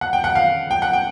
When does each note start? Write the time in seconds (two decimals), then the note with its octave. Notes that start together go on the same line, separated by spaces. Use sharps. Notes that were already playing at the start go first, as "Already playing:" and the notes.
0.01 F#5
0.13 G5
0.24 F#5
0.35 F5
0.71 G5
0.82 F#5
0.93 G5